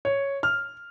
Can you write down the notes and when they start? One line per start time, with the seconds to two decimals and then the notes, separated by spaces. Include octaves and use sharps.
0.05 C#5
0.43 F6